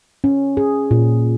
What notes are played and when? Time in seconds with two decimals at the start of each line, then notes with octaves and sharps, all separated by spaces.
0.24 C#4
0.57 G#4
0.91 A#2